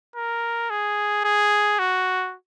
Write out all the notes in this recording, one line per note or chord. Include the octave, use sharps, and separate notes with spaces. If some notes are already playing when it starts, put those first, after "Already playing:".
A#4
G#4
G#4
F#4